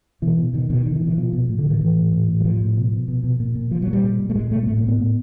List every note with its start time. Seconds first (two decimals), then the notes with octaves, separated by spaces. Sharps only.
0.22 B2 E3
0.38 B2
0.53 B2 D#3
0.70 B2 D#3
0.86 B2 D#3
0.96 E3
1.01 B2
1.07 E3
1.17 B2 F3
1.33 B2
1.49 A2
1.58 D3
1.65 A2 D#3
1.81 A2 E3
1.97 A2
2.12 A2
2.28 A2
2.40 F#3
2.45 A2 F3
2.61 A2
2.76 B2
2.92 B2
3.08 B2
3.24 B2
3.40 A#2
3.55 A#2
3.71 A#2 F3
3.82 A#2 F#3
3.93 G3
4.04 A#2
4.19 A#2
4.30 A3
4.35 A#2 G#3
4.51 A#2 A3
4.63 A#3
4.67 A2 A3
4.78 A#3
4.83 A2 B3
4.98 A2